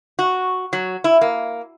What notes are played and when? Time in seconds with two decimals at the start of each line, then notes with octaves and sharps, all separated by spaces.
0.19 F#4
0.73 F#3
1.04 E4
1.21 A#3